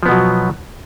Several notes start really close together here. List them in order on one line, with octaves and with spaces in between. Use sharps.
F3 B3 B2 F#3